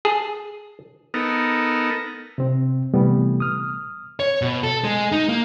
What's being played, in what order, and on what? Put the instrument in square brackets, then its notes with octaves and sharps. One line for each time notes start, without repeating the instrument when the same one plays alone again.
[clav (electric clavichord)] G#4 A5
[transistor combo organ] B3 D#4 A4 A#4
[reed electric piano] C3 C4
C3 E3 G3 A3 B3
D#6 F6
[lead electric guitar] C#5
B2
A4
G#3
D#4
A#3